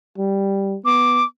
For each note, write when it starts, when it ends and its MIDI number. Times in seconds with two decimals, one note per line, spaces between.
0.18 0.76 55
0.85 1.23 59
0.85 1.24 86